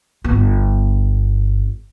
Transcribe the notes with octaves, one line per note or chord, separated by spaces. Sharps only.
G1 B3